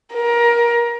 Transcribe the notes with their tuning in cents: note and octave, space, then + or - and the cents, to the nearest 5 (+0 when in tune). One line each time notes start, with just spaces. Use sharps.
A#4 +20